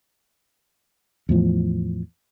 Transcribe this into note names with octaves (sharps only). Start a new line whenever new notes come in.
E2 A2 F3